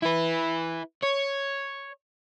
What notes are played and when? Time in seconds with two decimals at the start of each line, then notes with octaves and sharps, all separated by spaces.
0.02 E4 B4
1.03 C#5